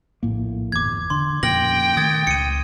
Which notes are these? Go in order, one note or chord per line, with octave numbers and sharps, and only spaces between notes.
A#1 A2 A#3
G1 E2 D6 G#6
D3 C6
F2 A#2 C#3 G5 A#6 F#7
D#3 A3 D#6 G#6 A6
C#2 C#7 D#7